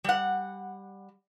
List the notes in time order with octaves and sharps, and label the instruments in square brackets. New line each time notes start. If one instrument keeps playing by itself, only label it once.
[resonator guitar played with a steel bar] G3 F#5